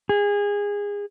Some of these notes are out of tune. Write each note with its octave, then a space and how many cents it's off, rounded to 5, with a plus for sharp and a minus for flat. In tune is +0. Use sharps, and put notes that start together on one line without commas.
G#4 -25